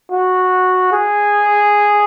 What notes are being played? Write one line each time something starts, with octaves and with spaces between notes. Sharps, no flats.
F#4
G#4